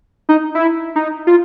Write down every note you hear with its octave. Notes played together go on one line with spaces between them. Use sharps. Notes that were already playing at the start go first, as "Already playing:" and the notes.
D#4
E4
D#4
F4